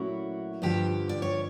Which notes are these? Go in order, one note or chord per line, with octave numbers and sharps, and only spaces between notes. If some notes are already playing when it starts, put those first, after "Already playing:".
Already playing: A#2 F#3 A3 C#4 E4 F#4
G2 D3 F3 G4
D5
C#5